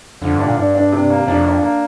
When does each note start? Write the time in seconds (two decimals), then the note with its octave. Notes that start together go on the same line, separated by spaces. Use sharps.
0.22 F2 D3
0.34 G2
0.39 D4
0.45 A#2
0.57 G2 D4
0.75 D4
0.92 C3
1.10 A#3
1.28 F2 D4
1.46 D4
1.63 A#3